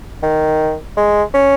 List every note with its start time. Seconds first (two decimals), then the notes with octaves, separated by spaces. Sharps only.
0.23 D#3
0.97 G#3
1.34 C#4